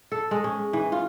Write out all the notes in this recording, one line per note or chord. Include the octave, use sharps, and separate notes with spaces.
A4
G#3
C#4
E3
F4